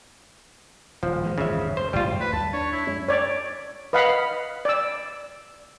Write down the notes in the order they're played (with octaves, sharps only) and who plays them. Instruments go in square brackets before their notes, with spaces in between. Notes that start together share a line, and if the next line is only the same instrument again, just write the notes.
[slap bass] D#1 [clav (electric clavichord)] F3
[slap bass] E3 G#3
[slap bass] F#1 D#2 G#2 [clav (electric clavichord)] C#3 E5
[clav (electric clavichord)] C5
[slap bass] A1 F#2 A3 [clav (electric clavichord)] G3 F4
[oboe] B4
[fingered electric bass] D#2 G3 [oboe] A5
[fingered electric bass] D4 [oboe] C#5
[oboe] E4
[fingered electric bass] F#2 G#3 C#4
[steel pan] C#5 D5
B4 D#5 F5 F#5 B5
D5 E6